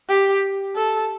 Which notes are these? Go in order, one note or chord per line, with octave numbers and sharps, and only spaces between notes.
G4
A4